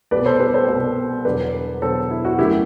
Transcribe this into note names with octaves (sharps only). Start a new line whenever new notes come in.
C2 B2 G3 B4 D5
A4 C5
G4 B4
A4 C5
C2 B2 G3
E1 E2 D3 F#3 B4 D5
E1 E2 D3 F#3 A4 C5
E4
F#4
F#2 D3 A3 E4 G4